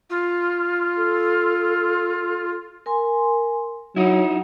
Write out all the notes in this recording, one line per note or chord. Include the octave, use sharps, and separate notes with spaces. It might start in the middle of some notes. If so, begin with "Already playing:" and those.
F4
A4
A#4 G#5 C6
F#3 D#4 E4 F#5